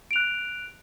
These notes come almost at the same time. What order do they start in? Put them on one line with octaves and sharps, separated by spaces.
D7 F7 F#6